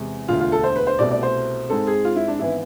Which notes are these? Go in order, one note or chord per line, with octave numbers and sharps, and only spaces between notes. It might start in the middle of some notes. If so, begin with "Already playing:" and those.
Already playing: E2 C3 G#3
E1 D2 D3 F4
F4
A4
C5
B4
C5
C2 B2 A3 C4 D5
D5
C5
G#2 G#3 C4 A4
G#4
F4
E4
D4
G#1 E3 B3 E4